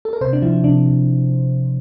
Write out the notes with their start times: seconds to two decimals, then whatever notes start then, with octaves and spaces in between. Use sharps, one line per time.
0.05 A4
0.13 A#4
0.21 C3 C5
0.33 D4
0.42 F3 E4
0.64 C3 D4
0.86 F3